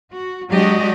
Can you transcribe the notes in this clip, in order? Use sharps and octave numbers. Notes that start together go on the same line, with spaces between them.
F#4
F#3 G#3 D4 F#4 G4 D#5